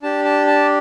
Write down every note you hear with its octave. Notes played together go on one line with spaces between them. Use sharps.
D4 G4 A5
A5
A5